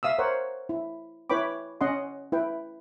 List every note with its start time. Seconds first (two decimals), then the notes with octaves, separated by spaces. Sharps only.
0.03 E5 F5 D#6 E6
0.19 A#4 C5 C#5 F#5
0.69 E4
1.30 E4 B4 C#5 G5 B5 D6
1.81 C#4 D#5 F#5 C6
2.32 E4 B4 G5